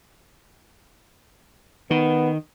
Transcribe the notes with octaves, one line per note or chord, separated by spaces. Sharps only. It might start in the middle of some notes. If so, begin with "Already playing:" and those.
D#3 B3